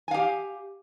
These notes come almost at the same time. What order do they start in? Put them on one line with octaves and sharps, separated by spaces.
G#5 F5 G4